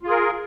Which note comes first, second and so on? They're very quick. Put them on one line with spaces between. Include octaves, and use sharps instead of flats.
F4 G#4 A#4